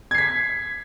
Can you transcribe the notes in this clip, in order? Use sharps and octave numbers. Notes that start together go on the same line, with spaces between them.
G#6 B6 C7